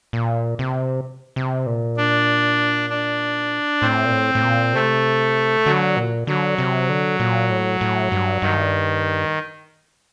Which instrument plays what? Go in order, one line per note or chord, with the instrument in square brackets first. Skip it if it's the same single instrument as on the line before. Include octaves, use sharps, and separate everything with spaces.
[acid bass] A#2
C3
C3
A#2
[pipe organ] D4
D4
[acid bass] A2 [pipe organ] C4
[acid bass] A#2
A2
A2
A#2
[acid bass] C3 [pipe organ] A3
[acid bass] D3 [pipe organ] F#3
[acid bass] A#2
[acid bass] D3 [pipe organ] F#3
[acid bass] C3
D3
A#2
A2
A2
G2
[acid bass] G2 [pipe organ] D#3